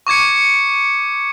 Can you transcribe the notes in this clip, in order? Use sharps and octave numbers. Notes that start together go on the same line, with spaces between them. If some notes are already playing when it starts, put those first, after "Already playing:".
C#6 D6 G#6 C#7